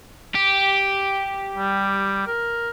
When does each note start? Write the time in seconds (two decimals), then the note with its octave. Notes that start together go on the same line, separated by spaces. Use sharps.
0.35 G4
1.56 G3
2.28 A#4